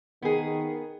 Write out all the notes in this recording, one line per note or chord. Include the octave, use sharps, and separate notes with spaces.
D#3 B3 G#4